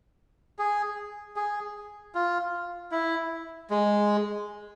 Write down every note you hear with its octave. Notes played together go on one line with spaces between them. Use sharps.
G#4
G#4
F4
E4
G#3